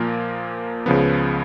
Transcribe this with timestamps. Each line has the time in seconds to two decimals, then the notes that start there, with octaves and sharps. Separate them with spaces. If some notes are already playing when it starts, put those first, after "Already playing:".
Already playing: A#2 F3 A#3 F4 A#4
0.86 C#2 C#3 F3 B3